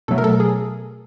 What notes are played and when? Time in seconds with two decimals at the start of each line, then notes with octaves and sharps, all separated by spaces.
0.08 B2 F#3 A3 A4
0.18 A#4
0.24 A4
0.40 G#4